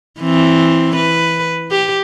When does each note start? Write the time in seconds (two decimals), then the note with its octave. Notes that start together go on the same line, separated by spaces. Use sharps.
0.20 E3 C4
0.96 B4
1.71 G4